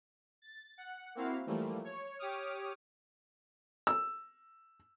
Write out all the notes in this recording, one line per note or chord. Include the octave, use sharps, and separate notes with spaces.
A6
F#5
A#3 C4 E4 F#4 F5
E3 F3 G3 A3 A#3
C#5
G4 C#5 D6 D#6 F6
E6